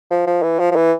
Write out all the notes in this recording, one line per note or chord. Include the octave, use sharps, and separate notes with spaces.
F3
F3
E3
F3
F3
E3